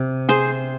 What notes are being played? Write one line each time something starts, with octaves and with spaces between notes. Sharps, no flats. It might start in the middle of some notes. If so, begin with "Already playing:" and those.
Already playing: C3
G#4 C5